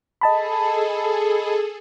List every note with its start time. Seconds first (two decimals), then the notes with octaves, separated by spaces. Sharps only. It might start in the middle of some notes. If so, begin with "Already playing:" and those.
0.21 G#4 A4 D#5 A5 B5